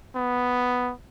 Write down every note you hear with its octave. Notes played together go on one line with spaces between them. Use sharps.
B3